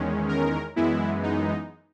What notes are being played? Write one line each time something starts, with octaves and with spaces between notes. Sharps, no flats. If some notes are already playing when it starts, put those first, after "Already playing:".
Already playing: E2 D#3 G#3 C#4
A#4
F#2 E3 G#3 B3 E4
D#4